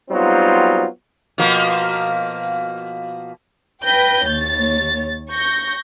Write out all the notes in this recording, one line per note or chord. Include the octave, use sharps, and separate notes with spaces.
F#3 G3 B3 C4 D#4 F4
B2 F3 A#3
B4 G5 G6 A#6
D#2 C#5 A6
C#6 G6 A#6